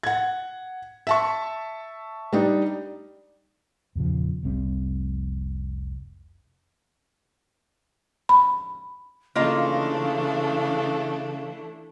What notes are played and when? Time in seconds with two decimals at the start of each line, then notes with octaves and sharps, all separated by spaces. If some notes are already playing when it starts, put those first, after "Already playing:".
0.03 F#5 G#6
1.07 E5 A5 C#6
2.33 G3 D4 D#4
3.95 E2 A#2 C#3 F3
4.43 F1 C2 G3 C4
8.29 B5
9.35 C#3 E3 A3 A#3 D4 F4 D#5